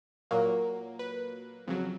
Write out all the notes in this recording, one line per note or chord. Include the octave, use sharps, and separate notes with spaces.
A#2 F#3 A#3
B4
F2 C#3 F#3